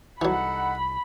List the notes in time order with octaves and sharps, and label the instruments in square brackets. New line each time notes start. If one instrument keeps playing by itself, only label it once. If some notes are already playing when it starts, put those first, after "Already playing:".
[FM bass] C2 [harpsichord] E3 F#3 [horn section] D#4 A4 F#5 [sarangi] B5